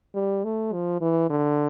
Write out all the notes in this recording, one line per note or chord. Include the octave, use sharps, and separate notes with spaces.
G3
A3
F3
E3
D3